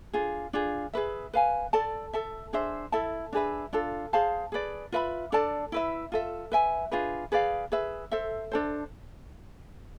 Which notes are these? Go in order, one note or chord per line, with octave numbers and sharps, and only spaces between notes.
D4 F4 G#4
D4 F4 G#4
G#4 B4 E5
B4 F5 G#5
A4 D5 A5
A4 E5 A5
D4 G#4 C5 E5
E4 A4 E5 A5
D4 G#4 B4 E5
D4 F4 A4
G#4 C5 F5 A5
G#4 B4 D5
F4 B4 E5 B5
D4 A4 D5 A5
E4 B4 E5
F4 A4 E5
B4 E5 G#5
D4 F4 G#4 B4
G#4 B4 D5 F5
G#4 B4 E5
A4 C5 E5
D4 A4 C5